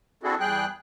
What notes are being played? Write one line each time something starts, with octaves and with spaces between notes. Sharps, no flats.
C4 D4 E4 F#4 G#4 A4
E2 G3 G#4 G5 F#6